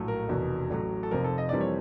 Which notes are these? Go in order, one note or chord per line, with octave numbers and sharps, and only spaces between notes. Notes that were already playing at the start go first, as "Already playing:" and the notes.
Already playing: A#1 A2 F#3 A3
A#4
F1 E2 B2
A1 A2 F#3
A4
F1 F2 C3 A#4
A4
D#5
F2 C3 E3 G3 A#3 D5
C#5